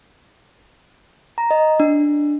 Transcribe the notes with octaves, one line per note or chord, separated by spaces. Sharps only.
A#5
D#5
D4